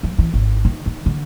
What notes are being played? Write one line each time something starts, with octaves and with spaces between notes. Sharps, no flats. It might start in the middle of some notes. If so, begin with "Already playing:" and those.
F3
E3
G#1
D#3
D#3
D3